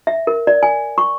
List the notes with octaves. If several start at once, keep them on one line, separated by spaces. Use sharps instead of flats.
E5
A#4
D5
G#5
C#6